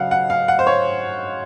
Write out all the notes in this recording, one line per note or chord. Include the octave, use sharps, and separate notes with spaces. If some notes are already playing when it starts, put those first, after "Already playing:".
Already playing: C#3 F#3 F5 F#5
F#5
F5
F#5
C5
C#5